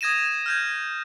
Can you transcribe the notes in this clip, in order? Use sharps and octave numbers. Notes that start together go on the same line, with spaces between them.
D#6 G#6 A#6 D#7 E7
F6 G6 G#6